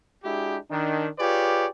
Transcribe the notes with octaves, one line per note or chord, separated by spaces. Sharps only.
G#3 D4 E4 F#4 G4
D#3 D4
F4 G4 G#4 B4 C#5 D5